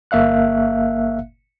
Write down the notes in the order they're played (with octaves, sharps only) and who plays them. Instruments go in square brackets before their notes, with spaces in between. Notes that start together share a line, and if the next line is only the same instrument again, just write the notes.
[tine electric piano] G1 A#3 E5 F5 F#6